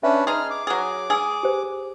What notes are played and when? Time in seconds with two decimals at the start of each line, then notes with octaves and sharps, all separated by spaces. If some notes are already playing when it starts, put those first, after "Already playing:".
0.03 C#4 D4 B4 E5
0.27 D#4 G#4 C6 F6
0.50 D6
0.67 F#3 G#4
1.10 G#4 G#5 E6
1.43 G4 C5